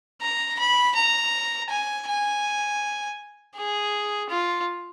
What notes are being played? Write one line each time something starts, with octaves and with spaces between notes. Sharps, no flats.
A#5
B5
A#5
G#5
G#5
G#4
F4